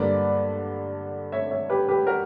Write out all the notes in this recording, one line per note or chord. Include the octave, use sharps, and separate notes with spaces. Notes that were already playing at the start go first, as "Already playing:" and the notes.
Already playing: G2 D3 A#3 B4 D5
C#5 E5
C#5 E5
G4 B4
G4 B4
F#4 A#4